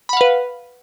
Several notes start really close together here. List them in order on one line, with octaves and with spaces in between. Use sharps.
B5 F#5 F5 B4